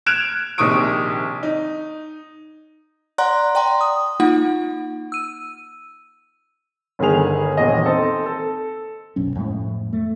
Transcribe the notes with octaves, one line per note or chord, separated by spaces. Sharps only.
F6 F#6 G#6 D7 E7 F7
A#1 C3 D#3 C#6 D#6 D7
D#4
D5 F#5 A#5 C6 F#6
D5 G5 A#5 C6
D#6
A#3 D#4 F4 F#5
E6 D#7
G1 D3 D#3 G#4 F7
D#1 A#1 E2 D#5
C4 D#4 A4 C5 D#5 A5
A4
F#1 B1 C#4
F2 A2 G#3 A3
A3